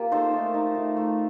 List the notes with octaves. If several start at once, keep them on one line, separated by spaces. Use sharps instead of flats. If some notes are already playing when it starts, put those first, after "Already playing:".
Already playing: A#3 F4 G4
D#4 A4 C5
A3
D#4
A3
A3